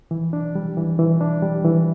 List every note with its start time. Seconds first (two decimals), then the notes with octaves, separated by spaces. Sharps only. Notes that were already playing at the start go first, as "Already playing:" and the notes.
0.11 E3
0.33 D4
0.55 G3
0.77 E3
0.99 E3
1.21 D4
1.42 G3
1.65 E3